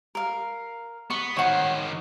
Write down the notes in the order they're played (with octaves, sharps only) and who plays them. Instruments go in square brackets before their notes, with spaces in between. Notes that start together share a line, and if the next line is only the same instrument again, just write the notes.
[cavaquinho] A#4 F5
[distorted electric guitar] B3 [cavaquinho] C#6
[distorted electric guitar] D#3 C5 [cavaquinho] C#5 F#5